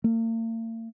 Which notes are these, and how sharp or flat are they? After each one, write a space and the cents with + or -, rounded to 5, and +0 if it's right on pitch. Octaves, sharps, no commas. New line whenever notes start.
A#3 -45